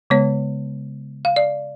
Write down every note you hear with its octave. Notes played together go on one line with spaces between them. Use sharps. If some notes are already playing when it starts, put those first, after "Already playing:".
C#3 G#3 B3 C#5
F5
D5